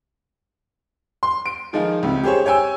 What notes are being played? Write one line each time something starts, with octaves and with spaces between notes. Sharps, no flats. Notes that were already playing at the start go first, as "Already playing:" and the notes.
C6
D7
D#3 F3 G#3 D#4 F4
C#2 C3
G4 G#4 C5 C#5
G4 C#5 G5 G#5 E6